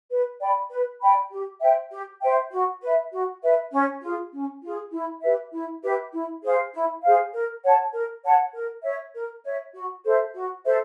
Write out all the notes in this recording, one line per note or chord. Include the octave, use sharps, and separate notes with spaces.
B4
D5 G5 B5
B4
D5 G5 B5
G4
C5 E5 G5
G4
C5 E5 G5
F#4
B4 E5
F#4
B4 E5
C#4
F4 G#4
C#4
F4 G#4
E4
G4 B4 E5
E4
G4 B4 E5
E4
G#4 C5 F5
E4
G#4 C5 F5
A#4
C#5 F#5 A5
A#4
C#5 F#5 A5
A#4
C#5 E5
A#4
C#5 E5
F#4
A4 C5 E5
F#4
A4 C5 E5